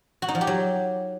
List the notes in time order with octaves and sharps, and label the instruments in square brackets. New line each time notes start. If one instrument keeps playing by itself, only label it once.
[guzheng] F#4
D#4
F3
G4
F#3